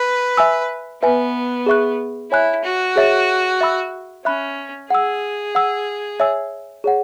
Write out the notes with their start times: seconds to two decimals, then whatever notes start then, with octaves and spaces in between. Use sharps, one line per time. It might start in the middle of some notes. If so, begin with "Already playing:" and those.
Already playing: B4
0.37 E5 G#5 E6
1.02 B3 B4 E5 G#5
1.66 G#4 E5 C#6 F#6
2.31 E4 C#5 G#5 B5 F#6
2.64 F#4
2.96 G#4 C#5 E5
3.61 E5 B5 E6
4.25 C#4 E5 B5 F#6
4.90 G#4 F#5 E6
5.55 F#5 E6
6.20 C#5 E5 G#5 E6
6.84 G#4 C#5 F#5